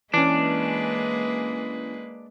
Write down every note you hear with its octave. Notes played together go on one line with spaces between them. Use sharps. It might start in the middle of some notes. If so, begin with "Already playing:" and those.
E3 G#3 A#3 C#4 D4 B4